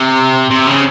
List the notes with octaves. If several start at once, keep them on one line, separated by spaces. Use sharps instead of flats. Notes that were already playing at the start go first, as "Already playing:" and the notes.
Already playing: C3
C3
C#3